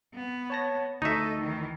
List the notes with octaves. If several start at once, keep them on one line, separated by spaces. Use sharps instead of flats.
B3
C#5 A5 A#6
D2 D#4 A4 D#5 E5 C#6
D#3 E3